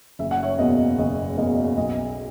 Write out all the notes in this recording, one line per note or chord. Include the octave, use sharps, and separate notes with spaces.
F#1 E5
F#5
C#5 E5
E2 B2 A#3 D#5
F#1 D#5
E2 B2 A#3 D#5
B1 D#5